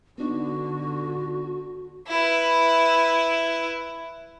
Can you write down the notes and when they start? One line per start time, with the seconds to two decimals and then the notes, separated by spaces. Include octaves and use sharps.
0.18 D3 B3 D4 D#4 F#4
2.08 E4 B4